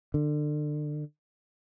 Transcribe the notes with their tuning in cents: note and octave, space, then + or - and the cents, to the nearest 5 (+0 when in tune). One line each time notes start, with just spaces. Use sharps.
D3 +30